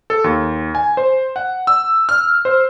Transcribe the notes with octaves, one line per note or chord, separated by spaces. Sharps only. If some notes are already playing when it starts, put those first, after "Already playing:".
A4
D#2
G#5
C5
F#5
E6
F6
C5